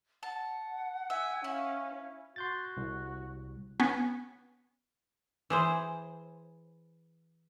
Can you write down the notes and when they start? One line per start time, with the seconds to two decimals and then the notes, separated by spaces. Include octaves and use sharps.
0.23 F#5 A5
1.10 E5 G#5
1.44 C#4 E4 F5
2.36 F#4 C6 G6 A6
2.77 C2
3.80 B3 C#4
5.50 E3 G#4 C5